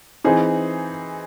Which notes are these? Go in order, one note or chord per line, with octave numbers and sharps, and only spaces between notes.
E3 C4 D#4 G#4